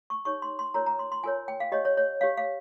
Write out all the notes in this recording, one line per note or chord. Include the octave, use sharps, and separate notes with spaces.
C#6
D#4 G4 C#5 C#6
C6
C6
F4 A#4 C#5 A#5
A#5
C6
C6
F4 A#4 C#5 G#5
G5
F5
G4 C#5 D#5
C#5
C#5
G4 C#5 F5
F5